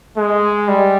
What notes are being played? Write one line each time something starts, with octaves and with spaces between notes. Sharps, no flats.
G#3
G3